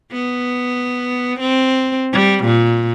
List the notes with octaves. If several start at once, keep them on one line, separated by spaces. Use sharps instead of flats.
B3
C4
G3
A#2